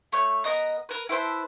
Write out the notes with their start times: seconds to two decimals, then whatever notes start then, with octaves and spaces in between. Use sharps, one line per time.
0.12 A3 C#5 G6
0.44 B3 A#4 D#5 A#5
0.89 A#4 B4
1.09 E4 B4 C5 A5